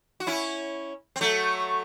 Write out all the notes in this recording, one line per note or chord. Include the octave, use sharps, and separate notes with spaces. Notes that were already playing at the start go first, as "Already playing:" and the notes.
F#4
C#4 E4
C4
F#3 A3